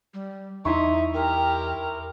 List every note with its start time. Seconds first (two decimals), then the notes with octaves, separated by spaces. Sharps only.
0.14 G3
0.65 E2 D#4 E4 E5 C6 C#6
1.14 G4 A#4 A#5